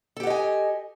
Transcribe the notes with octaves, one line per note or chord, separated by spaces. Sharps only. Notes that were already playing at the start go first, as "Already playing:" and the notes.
G4 A4 D#5 F#5 G#5